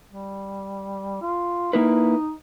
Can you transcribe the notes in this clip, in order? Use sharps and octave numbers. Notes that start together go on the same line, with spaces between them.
G3
F4
A#3 D#4 E4 B4